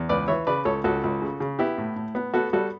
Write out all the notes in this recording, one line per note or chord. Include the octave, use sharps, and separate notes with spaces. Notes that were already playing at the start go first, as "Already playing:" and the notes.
Already playing: E2
C#2 B4 D5
E3 C#5 E5
C#3 B4 D5
C#2 A4 C#5
C#2 F#4 A4
C#2
C#3
C#3
B3 E4 G4
A2
A2
B3
B3 F#4 A4
G3 F#4 A4